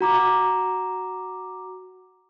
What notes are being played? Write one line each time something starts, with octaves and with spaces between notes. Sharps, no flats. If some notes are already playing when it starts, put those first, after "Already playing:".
F#4 A#5 D6